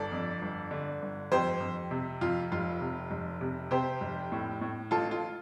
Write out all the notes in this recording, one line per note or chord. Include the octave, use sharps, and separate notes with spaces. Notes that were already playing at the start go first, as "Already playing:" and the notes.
Already playing: G1 A4 D5
F2
G1
D3
G1
F2 G4 C5
F2
C3
F2 F4
F1 F4
C3
F1
C3
C3 G4 C5
F1
A2
A2
A1 F4 A4
F4